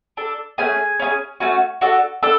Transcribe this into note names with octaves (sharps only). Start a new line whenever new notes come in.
D4 A4
A3 C#4 G#4 G#5
C#4 E4 G#4
A3 C#4 F#4
D4 F#4 A4
D4 A4